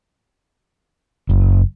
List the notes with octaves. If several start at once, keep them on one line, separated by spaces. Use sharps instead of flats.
F#1